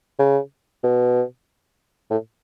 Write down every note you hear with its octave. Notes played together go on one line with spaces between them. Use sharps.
C#3
B2
A2